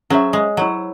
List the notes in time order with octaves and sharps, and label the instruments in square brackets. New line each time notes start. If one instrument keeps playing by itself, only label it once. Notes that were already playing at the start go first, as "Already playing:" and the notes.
[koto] F#3 [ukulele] C#4 G#4 C5 E5
[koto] G#3
[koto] F#3 [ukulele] E4 C5 F#5